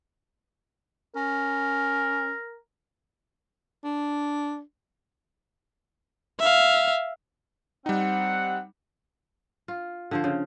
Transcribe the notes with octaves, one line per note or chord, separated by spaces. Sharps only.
C#4 A#4
D4
E5 F5
G3 C4 D#4 F#5
F4
D3 F3 C5
C#3